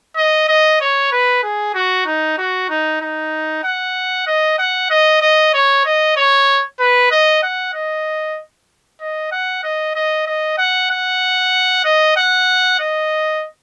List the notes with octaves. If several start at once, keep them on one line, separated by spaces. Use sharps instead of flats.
D#5
D#5
C#5
B4
G#4
F#4
D#4
F#4
D#4
D#4
F#5
D#5
F#5
D#5
D#5
C#5
D#5
C#5
B4
D#5
F#5
D#5
D#5
F#5
D#5
D#5
D#5
F#5
F#5
D#5
F#5
D#5